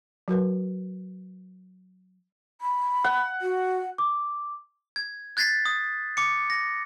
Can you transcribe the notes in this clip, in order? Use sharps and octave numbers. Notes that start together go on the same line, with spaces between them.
F#3 F#4 A#4 B4
B5
F#5
F#4
D6
G#6
F#6 G#6 A6 B6 C7
D#6
D6 C#7
A#6